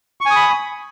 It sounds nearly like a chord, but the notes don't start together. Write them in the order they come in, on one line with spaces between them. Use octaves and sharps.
C#6 G#5 D#6 B5